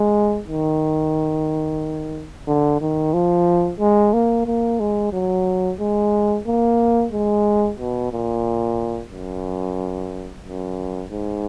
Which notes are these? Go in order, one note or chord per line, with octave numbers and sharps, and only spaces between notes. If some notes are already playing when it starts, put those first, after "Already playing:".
Already playing: G#3
D#3
D3
D#3
F3
G#3
A#3
A#3
G#3
F#3
G#3
A#3
G#3
B2
A#2
F#2
F#2
G#2